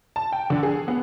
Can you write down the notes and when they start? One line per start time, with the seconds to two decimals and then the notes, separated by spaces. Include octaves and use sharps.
0.16 A5
0.32 G5
0.50 D3
0.63 G#4
0.88 B3